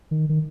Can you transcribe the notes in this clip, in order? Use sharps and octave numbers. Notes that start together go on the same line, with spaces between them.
D#3
D#3